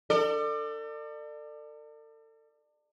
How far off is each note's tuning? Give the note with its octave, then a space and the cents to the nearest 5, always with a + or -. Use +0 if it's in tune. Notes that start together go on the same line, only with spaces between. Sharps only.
A4 +40 D5 +30